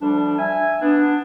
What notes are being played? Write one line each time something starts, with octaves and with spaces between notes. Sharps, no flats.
D2 F3 G3 D4
E5 G#5
B3 D4